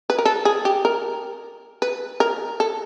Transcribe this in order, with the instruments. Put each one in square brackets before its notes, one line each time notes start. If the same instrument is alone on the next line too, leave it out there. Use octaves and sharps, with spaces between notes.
[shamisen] B4
A#4
A4
G#4
G4
A#4
B4
A#4
A4